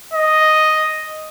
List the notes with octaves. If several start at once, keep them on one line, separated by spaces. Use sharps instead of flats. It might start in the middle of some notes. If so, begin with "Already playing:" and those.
D#5